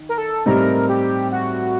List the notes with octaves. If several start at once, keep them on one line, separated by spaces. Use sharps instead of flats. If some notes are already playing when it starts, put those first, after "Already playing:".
Already playing: D#3
A#4
A4
A2 G3 C4 D#4 A#4
G4
F#4